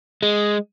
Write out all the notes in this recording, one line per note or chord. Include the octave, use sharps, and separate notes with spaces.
G#3